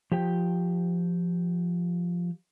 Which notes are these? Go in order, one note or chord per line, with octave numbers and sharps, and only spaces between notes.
F3 G4 G5